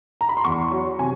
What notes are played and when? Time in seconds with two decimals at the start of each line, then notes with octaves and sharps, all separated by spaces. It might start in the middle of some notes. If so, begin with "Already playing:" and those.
0.21 A#5
0.29 B5
0.37 C6
0.44 E2 C#6
0.71 F#3
0.99 C3 G#5